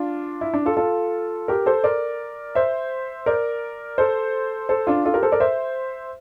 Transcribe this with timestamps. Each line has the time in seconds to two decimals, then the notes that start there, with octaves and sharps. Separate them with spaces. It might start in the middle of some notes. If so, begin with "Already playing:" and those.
Already playing: D4 F4
0.41 E4
0.54 D4
0.66 F4 A4
0.77 F4 A4
1.48 G4 A#4
1.66 A4 C5
1.84 A#4 D5
2.55 C5 E5
3.26 A#4 D5
3.98 A4 C5
4.69 A4 C5
4.87 D4 F4
5.05 F4 A4
5.14 G4 A#4
5.23 A4 C5
5.32 A#4 D5
5.40 C5 E5